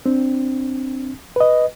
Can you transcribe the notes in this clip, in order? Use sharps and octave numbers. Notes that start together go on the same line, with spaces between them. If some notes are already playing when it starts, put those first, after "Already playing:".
C4 D4
B4 D#5